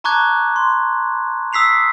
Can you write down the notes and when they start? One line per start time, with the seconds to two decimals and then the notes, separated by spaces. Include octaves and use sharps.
0.04 A5 A#5 C#6 D6 F#6 G#6
0.56 C6
1.53 D#6 E6 B6 C7 F7